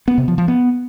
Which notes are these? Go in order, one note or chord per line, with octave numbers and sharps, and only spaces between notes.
B3
C3
F3
F3
B3